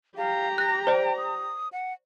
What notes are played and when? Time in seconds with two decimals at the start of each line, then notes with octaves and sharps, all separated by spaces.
0.17 G4 F5 A#5
0.58 F#6 A#6
0.87 C5 D5 G5
1.17 D#6
1.72 F#5